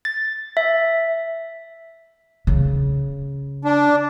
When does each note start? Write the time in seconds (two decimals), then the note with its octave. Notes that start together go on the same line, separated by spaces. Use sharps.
0.05 A6
0.57 E5
2.47 C#3
3.65 D4